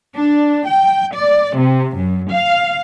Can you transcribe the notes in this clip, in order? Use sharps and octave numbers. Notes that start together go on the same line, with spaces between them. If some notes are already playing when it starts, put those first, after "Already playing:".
D4
G5
D5
C3
F#2
F5